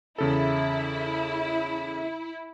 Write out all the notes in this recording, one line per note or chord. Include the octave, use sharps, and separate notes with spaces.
E2 C#3 E4 A4